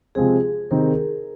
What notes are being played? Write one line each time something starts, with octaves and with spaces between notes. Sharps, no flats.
C3 F3 G#3 C4 G#4
C3 D#3 C4 D#4 A#4